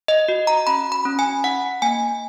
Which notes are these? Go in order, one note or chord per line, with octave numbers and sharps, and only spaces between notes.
D#5
F#4
A#5
C#4 B5
B5
C#4
G#5
D#4 F#5
A#3 G#5